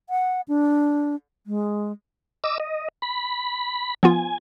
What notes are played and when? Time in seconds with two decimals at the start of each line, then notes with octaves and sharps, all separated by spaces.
0.10 F#5
0.48 D4
1.47 G#3
2.44 D#5 D6 E6
2.60 D#5
3.02 B5
4.03 F3 B3 F4 G#5